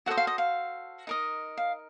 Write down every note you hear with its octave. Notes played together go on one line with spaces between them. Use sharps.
F#4 A4 C5 D#5 F#5
F5
D#5
F5
D#4 A#4 D#5
F5